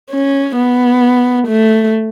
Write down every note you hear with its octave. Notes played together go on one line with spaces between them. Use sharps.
C#4
B3
A3